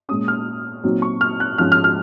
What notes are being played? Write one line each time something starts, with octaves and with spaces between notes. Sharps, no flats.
A#2 G#3 C#4 D#6
F6
A#2 F#3 C4 D#4
C#6
F6
F#6
G#2 F3 G#3 C#4 F6
F6
F6